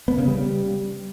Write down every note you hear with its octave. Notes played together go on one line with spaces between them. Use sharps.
B3
C#3
G3